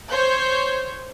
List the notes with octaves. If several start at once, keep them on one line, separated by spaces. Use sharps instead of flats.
C5 C#5 G6